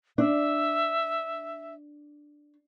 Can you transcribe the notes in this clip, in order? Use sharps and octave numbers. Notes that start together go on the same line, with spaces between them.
D4 E5